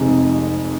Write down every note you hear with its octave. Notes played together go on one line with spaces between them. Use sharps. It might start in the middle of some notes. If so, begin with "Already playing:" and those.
Already playing: F1 F2 C3 G#3 D#4